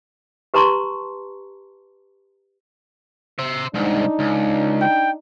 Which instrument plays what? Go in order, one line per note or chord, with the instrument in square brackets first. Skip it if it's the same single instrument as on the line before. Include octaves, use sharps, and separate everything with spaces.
[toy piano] G4 B4 A5 A#5 C6 C#6
[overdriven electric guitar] C5 E5
[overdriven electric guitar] C2 G#2 [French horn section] D4 D#4
[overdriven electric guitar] C#2
[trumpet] G5